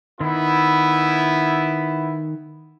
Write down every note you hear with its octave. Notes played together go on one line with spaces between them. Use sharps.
D#3 B3 E4